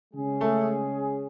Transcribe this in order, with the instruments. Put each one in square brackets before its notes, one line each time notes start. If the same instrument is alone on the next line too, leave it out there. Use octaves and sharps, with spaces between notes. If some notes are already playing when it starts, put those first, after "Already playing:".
[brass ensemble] C#3 G#3 C#4 G#4
[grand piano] A3 A4